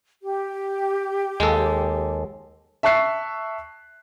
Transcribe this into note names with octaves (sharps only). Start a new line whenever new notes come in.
G4
D#2 G#3 A4
E5 A5 C#6 F#6 C7